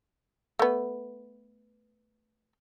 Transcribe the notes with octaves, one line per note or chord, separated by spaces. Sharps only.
A3 B3